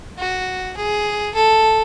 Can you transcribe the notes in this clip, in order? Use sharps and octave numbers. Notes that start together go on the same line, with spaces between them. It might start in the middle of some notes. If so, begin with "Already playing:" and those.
F#4
G#4
A4